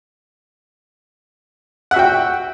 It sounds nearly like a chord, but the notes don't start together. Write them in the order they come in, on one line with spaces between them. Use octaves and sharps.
F#5 E5 F#4 G5